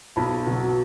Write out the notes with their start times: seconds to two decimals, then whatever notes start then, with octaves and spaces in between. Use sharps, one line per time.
0.16 B1 A5 B5
0.47 B2 F#3